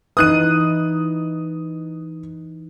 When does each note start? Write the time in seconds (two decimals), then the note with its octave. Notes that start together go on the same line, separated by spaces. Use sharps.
0.17 E3 D#4 B4 D#6 F#6 D#7